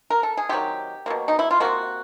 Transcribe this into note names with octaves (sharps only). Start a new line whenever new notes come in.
A#4
A4
G#4
C3 D#3 F#3 G4
B2 F#3 A#3
D#4
E4
F4
C3 F3 A#3 F#4